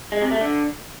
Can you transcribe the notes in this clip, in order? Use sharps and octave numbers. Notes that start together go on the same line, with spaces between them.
G#3
C3
A3
D3